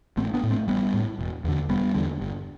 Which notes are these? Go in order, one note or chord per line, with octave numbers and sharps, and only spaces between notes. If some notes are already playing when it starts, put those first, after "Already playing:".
A1 A3 C4
B3 D4
A2
A3 C4
A1 G3 B3
A2
E1
E2 D3
E1 G3 B3
E2 D3
G1